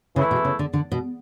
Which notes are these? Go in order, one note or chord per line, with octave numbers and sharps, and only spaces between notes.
C#3 E3 A3 E4
B2
C#3
D3
D3
B2